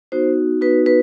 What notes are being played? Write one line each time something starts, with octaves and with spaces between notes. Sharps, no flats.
B3 D#4 F#4 C5
B3 D#4 F#4 B4
B4